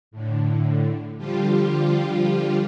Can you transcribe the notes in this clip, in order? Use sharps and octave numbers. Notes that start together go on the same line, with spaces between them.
A2 D3
D3 F3 G3 F4 G4